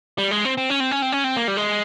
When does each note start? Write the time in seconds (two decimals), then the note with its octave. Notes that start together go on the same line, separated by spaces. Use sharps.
0.18 G3
0.31 G#3
0.45 C4
0.58 C4
0.70 C#4
0.80 C4
0.91 C#4
1.02 C4
1.12 C#4
1.24 C4
1.37 A#3
1.48 G3
1.57 G#3